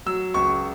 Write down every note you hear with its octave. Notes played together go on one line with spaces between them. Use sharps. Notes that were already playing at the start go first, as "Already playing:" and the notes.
F#3 E6
C#2 C#6